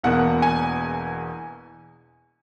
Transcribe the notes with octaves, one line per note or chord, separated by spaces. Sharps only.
E1 E2 B2 A#3 F#5
G#5